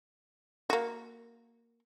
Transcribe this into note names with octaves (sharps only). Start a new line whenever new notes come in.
A#3 F#4